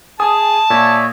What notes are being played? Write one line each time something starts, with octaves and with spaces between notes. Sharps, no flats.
G#4 G#5 A5 D#6
A#2 C#5 D5 E5